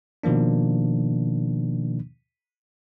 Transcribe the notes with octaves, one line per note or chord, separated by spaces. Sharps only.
B2 D#3 F3 A#3 D4